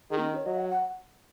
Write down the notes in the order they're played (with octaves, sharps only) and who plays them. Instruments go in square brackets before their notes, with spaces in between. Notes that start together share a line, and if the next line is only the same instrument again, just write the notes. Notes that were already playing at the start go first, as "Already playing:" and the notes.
[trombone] D#3 [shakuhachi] G#4
[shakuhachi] A#3
C#4
C#5
[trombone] F#3 [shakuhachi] D#5
[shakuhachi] F#5
F#5